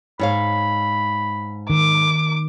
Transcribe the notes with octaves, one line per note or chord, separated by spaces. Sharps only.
G#2 C#5 F5 B5
D#3 D6